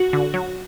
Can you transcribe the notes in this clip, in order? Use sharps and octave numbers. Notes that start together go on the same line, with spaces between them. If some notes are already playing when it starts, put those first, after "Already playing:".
Already playing: F#4
D3
F#3